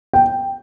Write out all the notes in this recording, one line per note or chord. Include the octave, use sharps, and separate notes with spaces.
G5